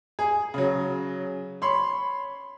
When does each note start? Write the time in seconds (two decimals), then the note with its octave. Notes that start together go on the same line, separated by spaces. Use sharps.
0.19 G#4
0.54 C#3 F#3
1.62 C#5 B5 C6